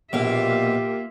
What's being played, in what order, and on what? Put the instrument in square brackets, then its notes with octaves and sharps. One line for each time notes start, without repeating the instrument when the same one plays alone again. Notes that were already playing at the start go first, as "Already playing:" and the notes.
[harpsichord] A#1 B2 [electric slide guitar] A#3 [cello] F4 E5 [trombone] G4